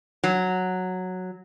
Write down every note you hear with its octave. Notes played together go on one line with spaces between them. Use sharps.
F#3